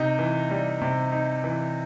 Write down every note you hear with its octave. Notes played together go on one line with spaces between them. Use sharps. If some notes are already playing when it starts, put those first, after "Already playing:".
Already playing: C3 D#4
E3
G3
C3
D#4
E3